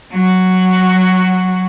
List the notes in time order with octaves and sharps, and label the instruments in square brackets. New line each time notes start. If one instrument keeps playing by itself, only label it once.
[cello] F#3 F#4